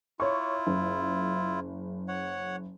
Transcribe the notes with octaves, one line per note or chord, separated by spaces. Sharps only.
E4 F4 C#5 C#6
F#1
C#5 F#5